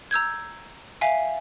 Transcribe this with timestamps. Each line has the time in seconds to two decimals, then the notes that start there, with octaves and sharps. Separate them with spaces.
0.11 A#5 E6 G6 G#6
1.01 E5 F5 G#5